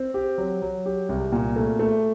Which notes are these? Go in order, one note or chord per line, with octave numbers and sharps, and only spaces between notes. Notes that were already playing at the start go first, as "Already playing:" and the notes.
Already playing: C4
G4
F#3
F#3
G4
C2
A#2
A3
A3